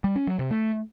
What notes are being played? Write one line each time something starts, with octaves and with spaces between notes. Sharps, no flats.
G3
C#4
F#3
C3
A3